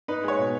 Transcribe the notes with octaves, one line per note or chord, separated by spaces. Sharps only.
D#4 B4
G#3 C#5
B2